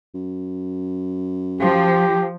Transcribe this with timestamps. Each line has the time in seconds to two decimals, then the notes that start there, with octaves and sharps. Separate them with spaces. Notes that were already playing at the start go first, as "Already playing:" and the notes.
0.15 F#2
1.61 F3 G4